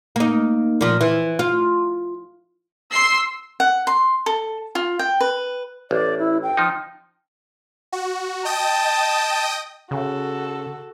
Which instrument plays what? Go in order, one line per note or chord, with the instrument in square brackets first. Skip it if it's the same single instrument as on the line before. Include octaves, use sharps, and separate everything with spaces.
[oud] A#3 D#4
A#2 F3
E3
F4
[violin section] C6 C7 [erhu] E6
[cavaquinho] F#5
C6
A4
F4
G5
B4
[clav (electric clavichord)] A1 [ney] D5
[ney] E4
G5
[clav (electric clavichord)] F3 D#4
[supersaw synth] F#4
[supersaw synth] D#5 G5 D#6 [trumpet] A5
[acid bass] C#3 [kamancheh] F#4 A4